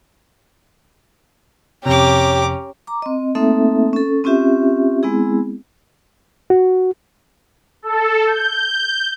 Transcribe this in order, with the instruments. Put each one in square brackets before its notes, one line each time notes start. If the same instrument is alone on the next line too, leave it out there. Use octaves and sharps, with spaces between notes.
[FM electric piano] F2 C3 [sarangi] C#4 [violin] G4 [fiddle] A#5 D6
[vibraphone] A#5 D6
C4 D#5
A3 A#3 C4 D#4 A4 E5
C#4 A4
C4 C#4 F4 G4 E5
G#3 B3 C4 E4 G#4
[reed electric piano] F#4
[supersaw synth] A4
G6